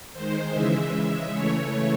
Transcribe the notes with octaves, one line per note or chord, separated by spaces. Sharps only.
D#3 G#3 C5
C#3 E3 G#3 E5
C#3 G#3 E5
C#3 E3 A3 C#5